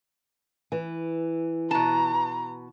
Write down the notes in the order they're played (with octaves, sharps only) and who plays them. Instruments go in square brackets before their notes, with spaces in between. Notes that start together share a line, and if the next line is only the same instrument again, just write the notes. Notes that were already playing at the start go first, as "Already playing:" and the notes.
[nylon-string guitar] E3
[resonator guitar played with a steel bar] B2 A5 [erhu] A#5